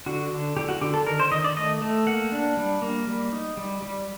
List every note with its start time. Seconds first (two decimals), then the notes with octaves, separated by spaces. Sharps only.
0.06 D3 F#4
0.31 D3
0.56 D3 G4
0.69 F#4
0.81 D3 G4
0.94 A4
1.06 D#3 A#4
1.20 C5
1.32 D#3 D#5
1.44 D5
1.57 A3 D#5
1.82 A3
2.07 A#3 F#5
2.32 D4
2.57 G3
2.82 A#3
3.07 G3
3.32 D#4
3.57 G3
3.82 G3